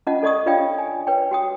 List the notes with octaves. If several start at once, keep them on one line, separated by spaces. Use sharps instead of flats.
C#4 F4 D#5 F#5 A5
A4 D5 D#5 C#6 D#6
D4 F4 C#5 D5 F5 G5
G#5
B4 C#5 G5
F#4 G5 D#6